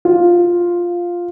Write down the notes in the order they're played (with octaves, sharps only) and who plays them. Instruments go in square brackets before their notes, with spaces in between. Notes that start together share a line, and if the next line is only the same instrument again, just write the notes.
[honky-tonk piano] F4